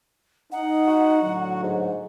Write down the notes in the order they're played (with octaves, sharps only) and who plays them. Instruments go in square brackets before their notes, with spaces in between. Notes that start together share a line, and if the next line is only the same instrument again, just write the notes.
[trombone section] D#4 [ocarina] F#5
[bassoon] F#4
[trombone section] A2 D3 F#3
[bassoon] G#2